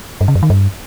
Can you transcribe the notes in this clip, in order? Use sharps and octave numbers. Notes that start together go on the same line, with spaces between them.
G2
C#3
F#2
D#3
G2